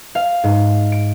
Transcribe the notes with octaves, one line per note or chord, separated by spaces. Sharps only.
F5
G#2
D7